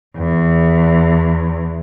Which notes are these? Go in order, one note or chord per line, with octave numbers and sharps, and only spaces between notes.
E2